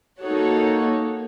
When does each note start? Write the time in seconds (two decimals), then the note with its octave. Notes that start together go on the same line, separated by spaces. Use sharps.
0.21 A#3 D#4 F#4 A4 C#5